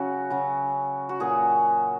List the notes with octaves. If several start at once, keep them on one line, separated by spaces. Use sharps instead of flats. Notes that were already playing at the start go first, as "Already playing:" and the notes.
Already playing: C#3 F#3 F#4
C#3 F#3
F#4
A#2 F#3 G#4